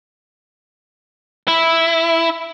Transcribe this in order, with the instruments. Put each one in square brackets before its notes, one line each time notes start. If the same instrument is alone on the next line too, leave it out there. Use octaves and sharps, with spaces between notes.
[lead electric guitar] E4